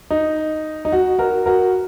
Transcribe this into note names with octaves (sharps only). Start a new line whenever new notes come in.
D#4
D#4
F#4
F#4 A#4
F#4 A#4